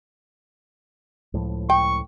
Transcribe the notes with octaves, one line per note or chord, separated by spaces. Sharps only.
C#2 A2 F3
G5 C#6